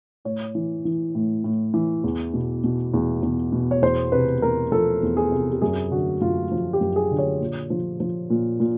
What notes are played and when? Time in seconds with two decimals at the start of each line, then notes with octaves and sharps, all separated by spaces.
0.25 A2 C#5
0.55 E3
0.85 E3
1.15 A2
1.44 A2
1.74 E3
2.04 E2
2.34 B2
2.64 B2
2.94 E2
3.22 E2
3.52 B2
3.71 C#5
3.82 E2 C5
4.12 C3 B4
4.42 E2 A#4
4.72 F3 A4
5.03 E2
5.17 G#4
5.32 C3
5.52 G4
5.62 F#2 G#4
5.91 D3 F#4
6.21 F#2 F4
6.51 F3
6.73 G4
6.81 F#2
6.96 G#4
7.11 D3
7.19 C#5
7.41 A#2
7.70 F3
8.00 F3
8.30 A#2
8.60 A#2